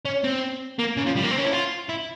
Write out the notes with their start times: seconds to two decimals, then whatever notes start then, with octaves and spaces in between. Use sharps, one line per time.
0.05 C#4
0.24 C4
0.79 A#3
0.97 C#3
1.06 F3
1.16 G3
1.23 A#3
1.31 C4
1.38 C#4
1.45 E4
1.53 F4
1.89 E4